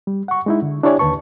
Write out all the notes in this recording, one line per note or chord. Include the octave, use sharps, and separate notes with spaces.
G3
F#5 C#6
G#3 D#4 E4
D3
D4 E4 G4 C#5 D5 G#5
D#2 D3 B4 A5 C#6